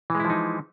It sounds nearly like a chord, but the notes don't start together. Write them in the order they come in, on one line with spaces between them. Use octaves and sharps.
E3 G#3 E4 F3 D#4